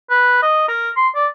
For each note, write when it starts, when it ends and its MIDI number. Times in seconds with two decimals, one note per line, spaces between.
0.10 0.38 71
0.43 0.68 75
0.68 0.90 70
0.97 1.08 84
1.16 1.27 74